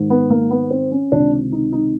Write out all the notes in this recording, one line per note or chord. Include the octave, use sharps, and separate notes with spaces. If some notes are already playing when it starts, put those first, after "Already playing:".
Already playing: G#2 D#3
B3
A#3
B3
C4
C#4
C#2 C3 D#3 D4
D#4
D#4